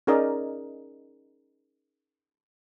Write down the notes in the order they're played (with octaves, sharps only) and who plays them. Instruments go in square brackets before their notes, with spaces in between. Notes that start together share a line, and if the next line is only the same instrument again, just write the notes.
[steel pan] C#4 D#4 G#4 A#4 D5 D#5